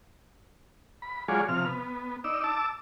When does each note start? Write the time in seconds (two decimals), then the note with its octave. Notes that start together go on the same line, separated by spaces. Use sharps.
1.02 B5
1.28 F#3 G#3 F4 G#4 C#5 D5
1.49 C3 F3 F6
1.66 B3
2.24 D#4 D5 E6
2.44 A5 D6 E6